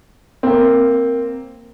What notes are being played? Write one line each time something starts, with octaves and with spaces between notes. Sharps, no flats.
A#3 C4